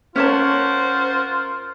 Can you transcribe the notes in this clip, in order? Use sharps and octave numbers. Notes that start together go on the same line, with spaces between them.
C#4 F4 A#4 C5 C#5 F#5 A5